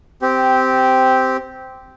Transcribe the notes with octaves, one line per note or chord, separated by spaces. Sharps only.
C4 G4